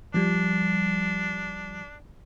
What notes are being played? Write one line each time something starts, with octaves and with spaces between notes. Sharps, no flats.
F3 G3 D4